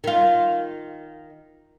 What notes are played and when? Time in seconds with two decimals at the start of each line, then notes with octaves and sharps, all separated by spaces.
0.04 D#3 F4